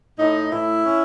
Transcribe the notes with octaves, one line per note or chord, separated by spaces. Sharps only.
A2 D#4
A2 E4
C#4